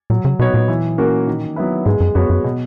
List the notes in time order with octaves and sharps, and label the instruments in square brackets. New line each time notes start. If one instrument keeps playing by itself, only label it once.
[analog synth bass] A#2 [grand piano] F#3
[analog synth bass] C#3
[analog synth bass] B2 [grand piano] B3 D#4 F#4 C#5
[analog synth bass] A#2
[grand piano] E3
A#3 C#4 F#4 A#4
D#3
F#3 B3 E4 B4
[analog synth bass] G#2 [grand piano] G#3
[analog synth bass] F#2
[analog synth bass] F#2 [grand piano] B3 F#4 C#5
[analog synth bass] F#2
[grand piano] B2